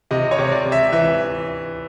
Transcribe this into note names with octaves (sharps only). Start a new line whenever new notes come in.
C3 D#5
C#5
C3
D5
C3
E5
E3 E5